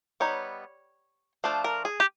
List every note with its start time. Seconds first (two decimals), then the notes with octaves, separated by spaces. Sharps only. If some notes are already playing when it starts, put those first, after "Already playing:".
0.20 G3 B3 D#4 C#5
1.44 F3 A3 D4 F4 C5
1.64 A#4
1.85 G#4
2.00 G4